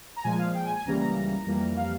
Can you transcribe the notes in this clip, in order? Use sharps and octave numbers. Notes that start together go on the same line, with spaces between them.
A#5
A#2 F3 G#3 G#5
F5
G5
G#5
G#5
C#2 C#3 E3 G3 A#3 A#5
A#5
F2 E3 G3 A#3
F5